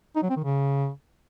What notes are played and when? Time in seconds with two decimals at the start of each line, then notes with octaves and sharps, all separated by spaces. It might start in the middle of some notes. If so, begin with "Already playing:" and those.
0.16 D#4
0.23 F#3
0.30 C4
0.37 D#3
0.44 C#3